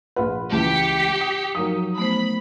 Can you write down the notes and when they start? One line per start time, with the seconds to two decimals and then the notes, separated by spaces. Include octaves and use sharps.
0.16 A#1 F4 B4 F#5 B5 C6
0.52 C#2 E3 G4 A5 B6 C#7
1.21 D#6
1.55 F3 F#3 D#4 A#4 D#6
1.98 A3 B3 C5 B5